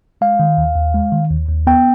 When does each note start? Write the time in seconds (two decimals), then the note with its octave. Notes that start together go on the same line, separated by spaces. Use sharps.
0.21 G#3 F5
0.40 D#3
0.58 D#2
0.76 D#2
0.94 G#3
1.12 D#3
1.31 D#2
1.49 D#2
1.67 B3 G5